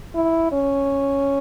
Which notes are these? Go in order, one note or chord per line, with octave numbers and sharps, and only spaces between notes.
E4
C#4